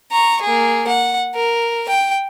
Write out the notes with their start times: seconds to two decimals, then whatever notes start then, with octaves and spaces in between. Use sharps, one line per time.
0.11 A#5 C#6
0.42 A#3 G#4
0.88 F#5
1.35 A#4
1.89 G5